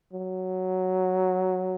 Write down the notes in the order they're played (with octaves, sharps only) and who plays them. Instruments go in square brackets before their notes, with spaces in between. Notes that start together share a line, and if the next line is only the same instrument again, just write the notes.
[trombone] F#3